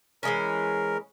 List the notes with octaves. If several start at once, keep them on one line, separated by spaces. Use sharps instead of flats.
E3 G#3 C#4 A#4